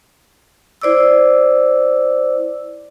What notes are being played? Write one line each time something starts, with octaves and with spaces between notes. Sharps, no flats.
E4 C5 D5 D6 E6